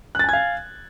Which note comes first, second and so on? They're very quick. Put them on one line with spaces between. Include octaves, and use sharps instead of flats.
F#6 A6 G#5 G#6 F5